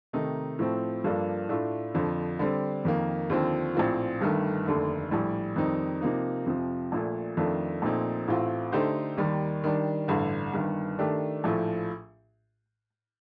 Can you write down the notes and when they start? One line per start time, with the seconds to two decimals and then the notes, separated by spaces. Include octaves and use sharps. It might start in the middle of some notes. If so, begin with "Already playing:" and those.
0.13 C3 D#3 A3 D#4
0.59 A2 F3 A3 C4
1.04 G2 F3 A#3 D4 A4
1.49 A2 A3 D4 F4
1.95 F2 D3 F3
2.39 D3 G3 C4
2.85 F2 D#3 A#3
3.30 D#2 D3 F3 C4
3.75 A#1 A2 F3 C4 F4
4.21 G1 G2 D#3 A3
4.65 F1 D#2 D3 A3
5.11 A#1 A2 G3
5.56 F2 D#3 G3 C4 D#4
6.01 C3 F3 A#3 D#4
6.46 F2 C3 F3
6.92 A#1 A#2 A3
7.37 F2 D#3 A3 D4 F4
7.82 A#1 A#2 A3 C4 D#4
8.28 A1 A2 A3 C4 F4
8.72 D3 A3 D#4 G4 C5
9.17 D#2 D#3 G3
9.64 D#3 G3 D4
10.08 A1 G2 D3
10.53 G1 G2 D#3
10.99 D#3 A3 D4 G4
11.44 A#1 A2 F3 A3